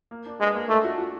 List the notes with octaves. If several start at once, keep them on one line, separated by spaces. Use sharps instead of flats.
A#3
D4
G#3 B4
A#3
A3 D4
F#4
F#4